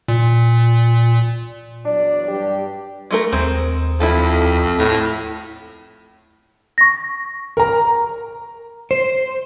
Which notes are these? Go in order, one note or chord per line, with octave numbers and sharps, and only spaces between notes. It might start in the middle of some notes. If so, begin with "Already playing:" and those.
A#2
E2 F#3 D4 D5
G2 G4
G#3 A3 A#4
D#2 G#3 C4
F2 E4 A4
A2
C#6 A#6
A#4 A#5
C5